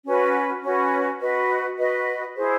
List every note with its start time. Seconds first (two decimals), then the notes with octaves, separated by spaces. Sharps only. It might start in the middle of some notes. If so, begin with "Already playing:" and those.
0.04 C#4 F#4 B4
0.62 C#4 F#4 B4
1.20 F#4 B4 D#5
1.78 F#4 B4 D#5
2.35 E4 G#4 C5